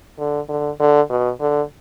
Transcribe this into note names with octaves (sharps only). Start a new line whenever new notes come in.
D3
D3
D3
B2
D3